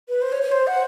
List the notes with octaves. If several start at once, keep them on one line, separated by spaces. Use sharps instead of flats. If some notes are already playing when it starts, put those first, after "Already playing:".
B4
C5
C#5
C#5
C5
F#5